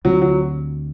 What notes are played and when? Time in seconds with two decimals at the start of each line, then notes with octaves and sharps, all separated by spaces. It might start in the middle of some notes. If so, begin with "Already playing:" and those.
0.04 D2 D3 F#3 G3 C4
0.22 F#3